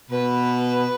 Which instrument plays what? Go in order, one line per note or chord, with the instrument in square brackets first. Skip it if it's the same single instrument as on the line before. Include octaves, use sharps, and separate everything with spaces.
[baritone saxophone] B2 [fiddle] B4